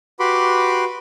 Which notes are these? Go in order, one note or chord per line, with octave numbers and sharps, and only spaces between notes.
F#4 G4 B4 B5 C6 D6